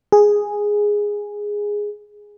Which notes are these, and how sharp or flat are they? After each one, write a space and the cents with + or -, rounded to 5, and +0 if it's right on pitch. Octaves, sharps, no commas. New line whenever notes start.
G#4 -5